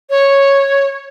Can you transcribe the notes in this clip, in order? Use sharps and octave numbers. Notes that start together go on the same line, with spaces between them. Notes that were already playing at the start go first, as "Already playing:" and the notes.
C#5